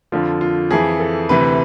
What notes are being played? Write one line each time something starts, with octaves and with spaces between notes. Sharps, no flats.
F2 D3 F3 F4
F4
F2 E3 G#4
A4
D2 C3 E3 B4